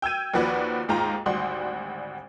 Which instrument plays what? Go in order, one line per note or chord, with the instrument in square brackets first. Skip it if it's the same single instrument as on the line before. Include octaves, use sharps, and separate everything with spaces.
[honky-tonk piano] G5 E6 G6 G#6 D#7
D#2 F3 F#4 B4 D5
D#2 G#2 F4 G5 A#5
G#1 D2 G3 F#4 C6